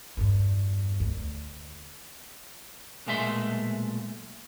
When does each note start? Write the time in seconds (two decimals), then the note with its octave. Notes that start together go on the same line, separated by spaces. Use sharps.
0.17 E2 G2
1.00 D2
3.06 B1 A#2 G#3 A3 E5 C6